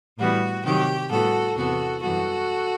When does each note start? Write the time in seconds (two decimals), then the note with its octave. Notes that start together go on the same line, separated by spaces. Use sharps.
0.17 A2 E3 G3 B3 F#4
0.63 C3 D#3 F#3 G4
1.09 A2 G3 B3 F#4 A4
1.56 E2 C3 E3 B3 F#4 A4
2.01 F#2 E3 G3 B3 F#4 A4